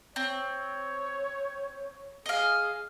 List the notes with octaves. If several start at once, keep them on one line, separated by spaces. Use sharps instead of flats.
C4 C#5
G#4 D#5 F5